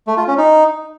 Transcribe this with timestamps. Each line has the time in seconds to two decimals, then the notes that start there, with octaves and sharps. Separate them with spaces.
0.07 A3
0.17 F4
0.28 C#4
0.38 D#4